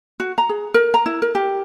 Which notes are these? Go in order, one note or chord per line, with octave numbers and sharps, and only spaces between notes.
F#4
A#5
G#4
A#4
A#5
E4
A#4
G4